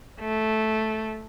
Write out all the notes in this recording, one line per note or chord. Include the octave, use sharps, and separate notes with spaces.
A3